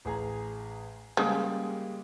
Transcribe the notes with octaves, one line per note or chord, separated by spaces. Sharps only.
A1 G#4 A#5
C#3 G3 G#3 A#3